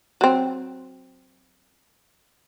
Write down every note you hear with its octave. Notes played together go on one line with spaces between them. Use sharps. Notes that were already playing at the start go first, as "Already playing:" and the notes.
F#3 C4